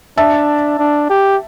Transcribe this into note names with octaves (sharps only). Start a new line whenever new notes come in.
D4 E5 A5
D4
G4